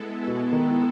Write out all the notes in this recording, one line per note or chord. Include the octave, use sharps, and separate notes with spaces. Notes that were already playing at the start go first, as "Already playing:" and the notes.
Already playing: G#3 B3 E4 A4
B2
D#3